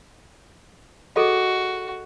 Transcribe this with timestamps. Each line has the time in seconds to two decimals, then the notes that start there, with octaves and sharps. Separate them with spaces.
1.16 F#4 G#4 A4 D#5